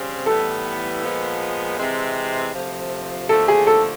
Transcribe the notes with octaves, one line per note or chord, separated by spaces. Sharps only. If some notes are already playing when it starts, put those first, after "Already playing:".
Already playing: C#3 G3 C4
A2 E3 G3 B3 A4
A#2 F3 G#3 B3
C3 E3 G#3 C4
D2 C3 F3
D#2 D3 F3 A3 A4
G#4
A4